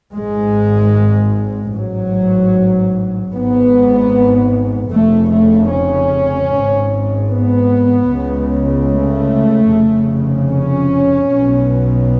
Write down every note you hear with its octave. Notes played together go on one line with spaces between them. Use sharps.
G#1 G#2 G#3
A1 G#2 F#3
G#1 G#2 B3
F1 F2 C#3 A3
A3
C#4
G#1 G#2
B3
C#2 C#3
A3
F1 F2 C#3
C#4
B1 B2